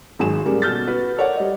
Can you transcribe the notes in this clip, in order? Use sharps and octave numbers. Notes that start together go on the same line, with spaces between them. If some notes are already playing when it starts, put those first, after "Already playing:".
G#1 F#3 G#3 G#4 G#5 E7
C#3 G3 G#3 A#3
B2 A4 F6 G6 A6
F#4 B4
A4 A#4 C#5 D5 F#5
G3 D#5